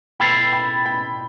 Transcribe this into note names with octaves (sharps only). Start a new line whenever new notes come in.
B2 B3 E4 A4 C5 G5 B5
G5 B5
G5 B5